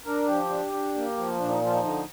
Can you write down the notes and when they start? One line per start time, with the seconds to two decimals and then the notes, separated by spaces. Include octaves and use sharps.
0.06 D4 A#4
0.28 F3 G4
0.50 D4
0.72 D4
0.95 A#3
1.17 F3
1.39 A#2 D4
1.49 D#4
1.61 F3
1.67 F4
1.72 D#4
1.83 D3 D#4